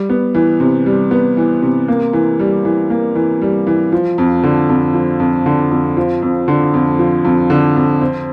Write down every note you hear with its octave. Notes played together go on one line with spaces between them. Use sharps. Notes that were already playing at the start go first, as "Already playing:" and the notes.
Already playing: G3
B3
E3
C3
G3
B3
E3
C3
A#3
E3
G3
E3
A#3
E3
G3
E3
F3
F2
D3
F2
F3
F2
D3
F2
F3
F2
D3
F2
F3
F2
D3
F2
C4